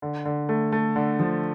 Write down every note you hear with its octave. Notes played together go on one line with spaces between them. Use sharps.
D3
D3
A3
A3
D3
F3